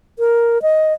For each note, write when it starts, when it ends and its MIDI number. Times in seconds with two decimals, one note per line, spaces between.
0.19 0.61 70
0.62 0.93 75